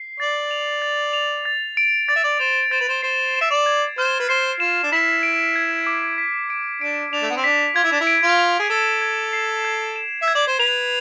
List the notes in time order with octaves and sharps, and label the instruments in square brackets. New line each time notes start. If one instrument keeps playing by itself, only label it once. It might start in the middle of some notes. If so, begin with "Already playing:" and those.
Already playing: [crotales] C7
[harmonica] D5 [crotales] A6
[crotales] F7
A6
F7
A6
D7
[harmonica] D5 [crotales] A6
[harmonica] E5
D5
[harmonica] C5 [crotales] F7
[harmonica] C5 [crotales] A6
[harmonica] B4
C5
[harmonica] C5 [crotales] C7
[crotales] E7
[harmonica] E5
D5
[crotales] G#6
[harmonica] C5 [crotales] F6
[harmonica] B4
[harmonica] C5 [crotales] C7
[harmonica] F4 [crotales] E7
[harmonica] D4
[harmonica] E4 [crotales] B6
[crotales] D7
G#6
D6
B6
D7
[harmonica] D4 [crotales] D7
[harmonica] D4 [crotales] F7
[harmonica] A3
B3
C4
[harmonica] D4 [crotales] B6
[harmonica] F4 [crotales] G#6
[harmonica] E4
D4
E4
[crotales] D7
[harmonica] F4
[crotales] F7
[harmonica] G#4
[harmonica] A4 [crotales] E7
[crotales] G#6
C7
G#6
E7
[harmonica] E5
[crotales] G#6
[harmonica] D5
C5
[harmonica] B4 [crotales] F7